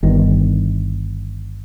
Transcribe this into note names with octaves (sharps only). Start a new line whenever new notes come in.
G1 G2 D#3